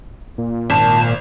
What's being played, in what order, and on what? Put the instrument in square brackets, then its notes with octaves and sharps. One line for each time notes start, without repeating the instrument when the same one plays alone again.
[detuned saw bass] A#2
[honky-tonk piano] G#1 E7 [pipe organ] A5